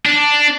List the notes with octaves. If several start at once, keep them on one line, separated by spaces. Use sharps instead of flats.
D4